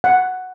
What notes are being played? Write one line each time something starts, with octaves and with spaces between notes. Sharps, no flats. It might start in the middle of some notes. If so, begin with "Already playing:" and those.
F#5